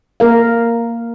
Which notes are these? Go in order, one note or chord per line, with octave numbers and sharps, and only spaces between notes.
A#3 A#4 F5